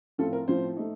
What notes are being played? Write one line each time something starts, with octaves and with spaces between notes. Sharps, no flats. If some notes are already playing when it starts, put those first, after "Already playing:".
A2 F3 C4 F4 A4
A#4
A2 F3 C4 F4 C5
A3 D#4